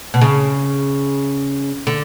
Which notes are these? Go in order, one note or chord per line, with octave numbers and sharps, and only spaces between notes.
B2
C#3
D3